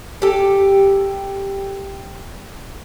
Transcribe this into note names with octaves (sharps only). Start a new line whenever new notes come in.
G4 A4